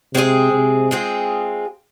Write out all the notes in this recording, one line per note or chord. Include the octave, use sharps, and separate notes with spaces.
C3 G#3 C4 F4 G#4
C3
G#3 C4 F4 G#4